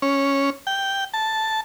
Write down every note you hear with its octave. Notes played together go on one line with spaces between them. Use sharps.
C#4
G5
A5